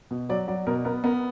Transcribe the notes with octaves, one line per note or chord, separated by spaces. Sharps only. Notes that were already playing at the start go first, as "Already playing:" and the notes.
B2
F#3 D5
F#3 D5
B2 A#4
B3 A#4
B3 A#4